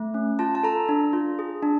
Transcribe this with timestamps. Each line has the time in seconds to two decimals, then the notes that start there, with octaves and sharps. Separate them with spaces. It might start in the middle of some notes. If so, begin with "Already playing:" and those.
Already playing: A3
0.14 C#4
0.39 F4 A5
0.55 A5
0.63 A4 A#5
0.89 D4
1.13 F4
1.39 G#4
1.63 D4